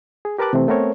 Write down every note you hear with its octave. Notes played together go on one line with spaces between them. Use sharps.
G#4
G4 A#4 B4 A5 D6 F#6
C3 E3 A3 C4
A3 B3 C4 A#4 C5 C#5